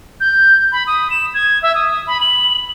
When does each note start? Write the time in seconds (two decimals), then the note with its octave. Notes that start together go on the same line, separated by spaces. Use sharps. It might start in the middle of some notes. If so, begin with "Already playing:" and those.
0.20 G6
0.72 B5
0.87 D#6
1.10 E7
1.34 G#6
1.63 E5
1.75 D#6
2.07 B5
2.21 F#7